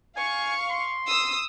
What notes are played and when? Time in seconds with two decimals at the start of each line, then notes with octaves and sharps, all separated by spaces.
0.16 F5 G#5 C#6
0.70 C6
1.08 D#6 E6